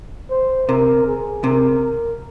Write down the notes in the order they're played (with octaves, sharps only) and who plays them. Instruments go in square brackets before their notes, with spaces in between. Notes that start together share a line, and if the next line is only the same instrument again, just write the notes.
[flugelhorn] C5
[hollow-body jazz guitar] C3 [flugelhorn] A#4
[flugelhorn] G#4
[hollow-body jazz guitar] C3 [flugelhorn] A#4